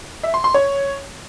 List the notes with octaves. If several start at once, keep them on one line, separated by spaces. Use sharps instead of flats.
E5
C6
C6
C#5